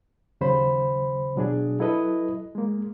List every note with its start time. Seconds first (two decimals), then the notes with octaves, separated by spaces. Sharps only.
0.41 D#2 C#3 F#3 C5 B5
1.36 B2 F#3 D4 G#4
1.79 F#3 E4 A4 B4 D#5
2.55 G#3 A#3